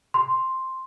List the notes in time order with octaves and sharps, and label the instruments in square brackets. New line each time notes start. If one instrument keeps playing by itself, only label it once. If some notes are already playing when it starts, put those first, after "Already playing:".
[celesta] C6